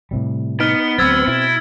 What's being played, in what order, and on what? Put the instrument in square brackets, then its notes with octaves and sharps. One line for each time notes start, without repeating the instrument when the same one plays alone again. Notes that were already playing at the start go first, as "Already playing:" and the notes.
[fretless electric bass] A2 C3 G3
[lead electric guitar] B3 [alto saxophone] D#4 [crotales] F6 D7
[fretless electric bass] D2 F#3 [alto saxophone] C4 [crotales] E6 G#6 A6
[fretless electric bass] B2 [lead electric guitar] E4